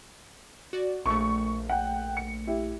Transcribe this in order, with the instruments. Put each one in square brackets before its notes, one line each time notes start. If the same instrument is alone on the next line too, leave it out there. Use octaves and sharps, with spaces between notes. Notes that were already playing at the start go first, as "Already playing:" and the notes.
[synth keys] F#4 D5
[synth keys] A#1 A3 [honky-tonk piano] C#6
[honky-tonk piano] F#5 G5
C#7
E4 G4